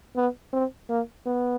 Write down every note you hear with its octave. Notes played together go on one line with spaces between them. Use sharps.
B3
C4
A#3
B3